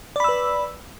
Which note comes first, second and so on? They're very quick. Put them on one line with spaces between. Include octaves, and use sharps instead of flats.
D5 B5 E6 B4